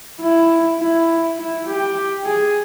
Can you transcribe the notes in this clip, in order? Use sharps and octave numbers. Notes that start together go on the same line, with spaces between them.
E4
E4
E4
G4
G#4